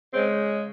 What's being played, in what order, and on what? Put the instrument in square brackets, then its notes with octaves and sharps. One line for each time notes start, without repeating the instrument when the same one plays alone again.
[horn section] C#3 G#3 C4